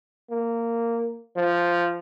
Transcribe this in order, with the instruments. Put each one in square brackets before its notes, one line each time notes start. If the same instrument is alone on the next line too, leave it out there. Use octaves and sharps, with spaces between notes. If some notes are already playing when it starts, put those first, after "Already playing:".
[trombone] A#3
F3